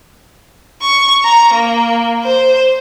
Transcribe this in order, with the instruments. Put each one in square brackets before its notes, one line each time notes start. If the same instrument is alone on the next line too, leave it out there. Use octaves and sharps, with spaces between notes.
[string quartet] C#6
A#5
A#3
C5